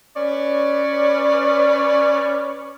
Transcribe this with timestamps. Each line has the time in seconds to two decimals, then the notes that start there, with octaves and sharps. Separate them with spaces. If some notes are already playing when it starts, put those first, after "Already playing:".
0.15 C#4 B4 C#5 D5